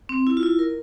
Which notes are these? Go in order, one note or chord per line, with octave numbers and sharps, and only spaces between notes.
C4
E4
F4
E4
A#4